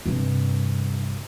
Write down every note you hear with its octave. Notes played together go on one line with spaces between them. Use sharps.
G2 C3